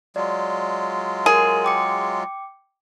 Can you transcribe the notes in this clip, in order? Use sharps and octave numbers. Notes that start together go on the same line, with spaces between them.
F#3 G#3 F4 D5
G#4 A#4
G5 D6 C#7